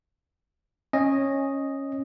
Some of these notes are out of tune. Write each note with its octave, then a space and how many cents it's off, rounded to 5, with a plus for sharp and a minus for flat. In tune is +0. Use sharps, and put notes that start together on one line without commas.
C#4 -15 D#5 +0